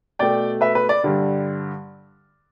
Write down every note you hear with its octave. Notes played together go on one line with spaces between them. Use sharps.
B2 A3 D5 G5
B4 E5
B4
D5
G2 D3 G3